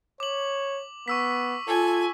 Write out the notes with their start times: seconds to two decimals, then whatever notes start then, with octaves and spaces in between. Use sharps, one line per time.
0.20 C#5 D6 F#7
1.08 B3 C#6 E6 B6
1.68 F4 A4 G#5